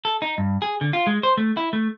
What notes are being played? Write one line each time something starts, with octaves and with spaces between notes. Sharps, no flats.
A4
D#4
G2
G#4
D3
F4
G#3
C5
A3
E4
A3